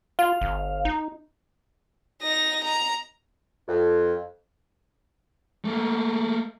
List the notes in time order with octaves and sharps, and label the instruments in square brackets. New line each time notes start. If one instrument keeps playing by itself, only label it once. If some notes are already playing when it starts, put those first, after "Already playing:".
[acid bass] F4 [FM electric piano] F5
[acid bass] G1
D#4
[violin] D#4 A#6
A#5
[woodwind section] F2
[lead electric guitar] A3 A#3